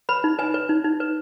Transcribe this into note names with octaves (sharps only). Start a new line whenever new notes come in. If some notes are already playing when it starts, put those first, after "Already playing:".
B4 B5
D#4
B4 G#5
B4
D#4
D#4
B4